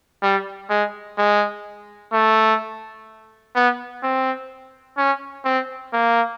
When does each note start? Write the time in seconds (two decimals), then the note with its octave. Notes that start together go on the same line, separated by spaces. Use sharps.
0.23 G3
0.70 G#3
1.18 G#3
2.13 A3
3.55 B3
4.03 C4
4.98 C#4
5.45 C4
5.93 A#3